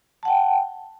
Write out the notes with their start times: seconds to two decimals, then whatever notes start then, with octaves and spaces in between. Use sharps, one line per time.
0.23 A5
0.25 F#5
0.28 G5